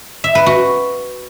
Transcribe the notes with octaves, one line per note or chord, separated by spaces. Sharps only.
E5
B4
F#4